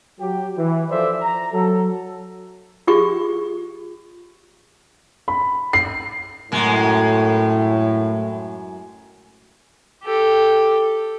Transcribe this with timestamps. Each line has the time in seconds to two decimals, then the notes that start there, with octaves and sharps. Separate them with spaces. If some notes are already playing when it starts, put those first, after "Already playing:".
0.20 F#3 G4
0.57 E3
0.90 F3 A4 C5 D5 E5
1.21 A#5
1.53 F#3 A4
2.87 F4 G4 G#4 C#6
5.28 B5
5.73 C7
6.52 F#2 A2 G#3
10.03 G4 A4